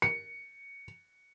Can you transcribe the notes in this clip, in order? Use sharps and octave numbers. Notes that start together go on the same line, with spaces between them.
C#7